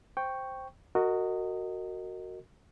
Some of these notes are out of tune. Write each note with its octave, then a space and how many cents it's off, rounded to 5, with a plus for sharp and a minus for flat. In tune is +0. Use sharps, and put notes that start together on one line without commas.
C5 +0 G5 +0 C#6 +0
F#4 +0 A#4 -30 D#5 +0